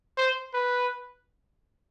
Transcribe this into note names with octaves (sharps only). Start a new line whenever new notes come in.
C5
B4